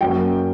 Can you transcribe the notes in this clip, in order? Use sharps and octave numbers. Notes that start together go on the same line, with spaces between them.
F#2 F#3 A#3 G5